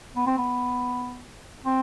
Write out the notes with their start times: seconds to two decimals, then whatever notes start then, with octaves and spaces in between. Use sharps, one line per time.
0.16 B3
0.26 C4
0.38 B3
1.65 C4